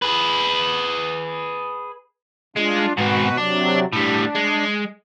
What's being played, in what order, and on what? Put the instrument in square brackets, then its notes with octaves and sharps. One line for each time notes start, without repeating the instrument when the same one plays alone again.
[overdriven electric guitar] G#4 B4
[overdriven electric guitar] G#3 [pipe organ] D4 F4
[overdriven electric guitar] G#2 C4 [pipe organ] B2 F#4 B4
[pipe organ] C3 F#3 [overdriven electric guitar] D4
[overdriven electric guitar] A2 G3 [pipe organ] D4
[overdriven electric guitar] G#3